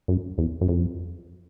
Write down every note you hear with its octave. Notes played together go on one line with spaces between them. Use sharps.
F#2
E2
F#2
F2